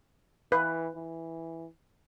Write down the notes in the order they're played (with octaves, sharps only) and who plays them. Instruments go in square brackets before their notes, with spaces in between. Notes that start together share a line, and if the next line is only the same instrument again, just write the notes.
[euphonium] E3 [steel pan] B4
[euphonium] E3